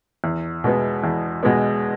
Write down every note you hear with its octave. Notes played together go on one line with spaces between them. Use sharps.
E2
B2 G#3 B3
E2
B2 G#3 B3